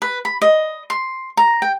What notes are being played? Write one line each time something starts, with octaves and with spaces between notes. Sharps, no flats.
B4
B5
D#5
C6
A#5
G5